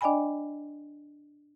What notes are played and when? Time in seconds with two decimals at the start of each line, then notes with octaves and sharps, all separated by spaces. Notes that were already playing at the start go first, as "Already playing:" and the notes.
0.01 D4 D5 D#5 G5 G#5 B5